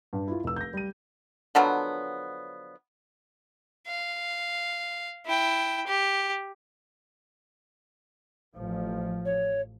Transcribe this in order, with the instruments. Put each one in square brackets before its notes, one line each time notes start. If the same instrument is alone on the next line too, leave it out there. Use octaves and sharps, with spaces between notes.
[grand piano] G2
E4 F4
F1 E6
G6 A#6
G3 D#7
[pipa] D3 F3 F#3 B3
[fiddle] F5
E4 G5
G4
[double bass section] A1 F3
[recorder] C#5